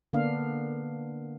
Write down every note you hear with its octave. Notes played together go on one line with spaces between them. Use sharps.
D3 A#3 B3 D4 F5